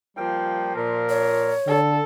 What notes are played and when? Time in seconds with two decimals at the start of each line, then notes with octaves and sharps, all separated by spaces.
0.17 F3 G3 A#3 G5
0.75 A#2 A#4
1.09 C#5
1.67 D3 A4